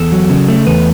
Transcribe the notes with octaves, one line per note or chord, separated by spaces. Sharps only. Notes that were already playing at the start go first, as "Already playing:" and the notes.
Already playing: E2 A4
F#3
C#3
A3
E2 B4